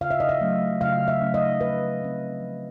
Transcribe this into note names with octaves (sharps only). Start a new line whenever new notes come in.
C#3 F5
E5
D#5
E5
F#3 A3 C#4
C#3 F5
E5
F#3 A3 C#4
D#5
F3 B4
A3 C4
F3